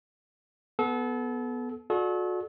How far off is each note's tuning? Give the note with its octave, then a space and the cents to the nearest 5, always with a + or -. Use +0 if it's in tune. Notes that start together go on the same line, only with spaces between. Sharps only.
B3 +0 A4 -30
F#4 -35 A4 -35 D5 +15